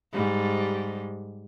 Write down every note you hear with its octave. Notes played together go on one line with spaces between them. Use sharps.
G#2 G3